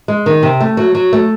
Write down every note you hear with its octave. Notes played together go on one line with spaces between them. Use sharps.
G#3
D#3
C3
A3
F#3
F#3
A3